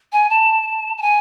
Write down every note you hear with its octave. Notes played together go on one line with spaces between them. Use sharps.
G#5
A5
A5
G#5